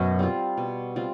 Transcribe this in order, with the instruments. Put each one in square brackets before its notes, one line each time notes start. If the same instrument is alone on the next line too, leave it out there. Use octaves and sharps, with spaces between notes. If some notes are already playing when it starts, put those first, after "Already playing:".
Already playing: [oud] F#2 [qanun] B2
[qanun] G3 C4 F4
B2
G3 C4 F4